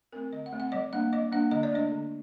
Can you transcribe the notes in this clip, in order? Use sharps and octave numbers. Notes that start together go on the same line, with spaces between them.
A3 C4 A#4
D3 D#5
F#5
A3 C4
F#5
G3 D#5
A#3 D4 F#5
G3 D#5
A#3 D4 F#5
D3 D#5
D5
A3 D4 D#5
D3